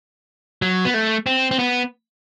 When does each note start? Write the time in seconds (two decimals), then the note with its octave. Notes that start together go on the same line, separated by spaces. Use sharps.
0.62 F#3
0.85 B3
0.94 A3
1.26 C4
1.51 C4
1.59 B3